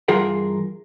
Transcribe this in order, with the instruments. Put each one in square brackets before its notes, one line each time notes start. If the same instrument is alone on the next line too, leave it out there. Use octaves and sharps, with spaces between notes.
[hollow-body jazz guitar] G2 E3 F4 G#4 A#4 F#5